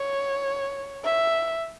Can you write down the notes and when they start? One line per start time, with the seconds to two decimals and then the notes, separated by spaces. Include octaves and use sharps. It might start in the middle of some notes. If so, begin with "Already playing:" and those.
Already playing: C#5
1.04 E5